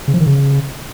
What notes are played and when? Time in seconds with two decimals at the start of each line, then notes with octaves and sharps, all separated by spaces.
0.08 C#3
0.14 F3
0.20 D#3
0.26 C#3